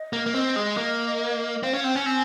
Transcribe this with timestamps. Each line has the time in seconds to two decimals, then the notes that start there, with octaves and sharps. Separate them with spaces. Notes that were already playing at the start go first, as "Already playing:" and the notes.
Already playing: D#5
0.13 A#3
0.26 A#3
0.34 C4 D#5
0.56 G#3
0.77 A#3
1.63 C4 F5
1.73 C#4 F5
1.84 C4 G5
1.95 C#4 G#5
2.06 C4 G#5